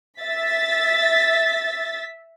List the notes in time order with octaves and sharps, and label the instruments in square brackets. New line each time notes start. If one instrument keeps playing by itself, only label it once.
[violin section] E5 A6 B6